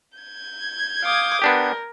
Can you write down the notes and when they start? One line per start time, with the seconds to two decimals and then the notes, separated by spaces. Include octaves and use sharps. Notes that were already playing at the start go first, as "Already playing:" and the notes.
0.18 G6 G#6
1.03 F5 D6 D#6
1.42 B3 D4 G4 A#4